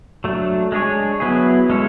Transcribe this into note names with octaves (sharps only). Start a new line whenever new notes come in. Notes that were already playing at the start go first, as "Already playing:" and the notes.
F#3 A3 D4
G#3 D4 G#4 C#5
F#3 B3 E4 G#4
G#3 C#4 E4 A4 C#5